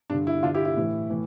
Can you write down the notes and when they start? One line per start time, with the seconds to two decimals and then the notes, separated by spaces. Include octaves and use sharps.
0.10 G2 D3 D4
0.27 E4
0.43 G2 D3 D4 F4
0.54 E4 G4
0.65 E4
0.77 A2 E3
1.10 A2 E3